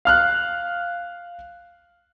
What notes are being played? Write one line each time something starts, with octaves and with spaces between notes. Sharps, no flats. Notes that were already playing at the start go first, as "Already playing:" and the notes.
F5 F6 F#6